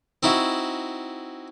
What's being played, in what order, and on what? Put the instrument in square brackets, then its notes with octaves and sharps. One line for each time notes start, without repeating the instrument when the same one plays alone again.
[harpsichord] C4 D#4 E4 F#4